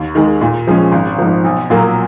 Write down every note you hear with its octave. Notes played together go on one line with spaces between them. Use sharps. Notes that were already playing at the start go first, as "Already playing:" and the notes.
Already playing: D#2
D#3 G#3
A#2
F3 G#3 C#4
G#1
G#2 F3
B1
A#2 F#3 A#3